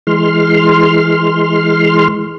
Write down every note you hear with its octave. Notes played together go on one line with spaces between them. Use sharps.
E3 G#3 C6 F6